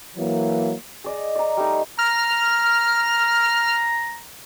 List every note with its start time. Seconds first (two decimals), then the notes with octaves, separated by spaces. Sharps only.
0.17 E3 F#3 A#3
1.04 G#4 D5 D#5
1.36 D5 A#5
1.57 G3 A3 D#4
1.99 A#5 F6